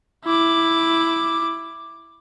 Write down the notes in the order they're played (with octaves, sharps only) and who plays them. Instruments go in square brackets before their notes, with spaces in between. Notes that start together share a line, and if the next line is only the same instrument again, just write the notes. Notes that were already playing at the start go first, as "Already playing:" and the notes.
[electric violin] E4 D6